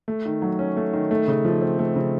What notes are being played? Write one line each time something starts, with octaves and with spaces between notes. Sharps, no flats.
A3
D#3
F#3
C#4
A3
D#3
A3
C#3
F3
C4
A3
C#3